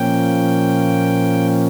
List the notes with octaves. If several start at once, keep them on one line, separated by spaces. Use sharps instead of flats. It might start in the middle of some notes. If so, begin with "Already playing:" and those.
Already playing: A#2 F3 A#3 C#4 G5